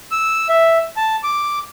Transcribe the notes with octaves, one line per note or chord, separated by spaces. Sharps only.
E6
E5
A5
D6